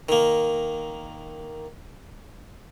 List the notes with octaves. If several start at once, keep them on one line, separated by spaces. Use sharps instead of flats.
D#3 A#3